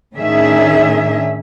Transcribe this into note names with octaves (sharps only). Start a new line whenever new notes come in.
A2 D#3 C#4 D4 G#4 E5